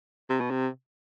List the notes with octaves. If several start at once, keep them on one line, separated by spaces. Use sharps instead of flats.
C3
B2
C3